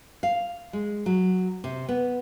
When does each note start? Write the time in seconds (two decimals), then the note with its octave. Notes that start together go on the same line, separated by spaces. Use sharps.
0.23 F5
0.73 G#3
1.06 F#3
1.64 C3
1.89 B3